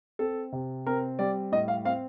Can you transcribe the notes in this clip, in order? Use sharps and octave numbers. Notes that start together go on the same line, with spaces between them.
C4 A4
C3
C4 A#4
G3 D5
A2 D#5
F5
C4 F5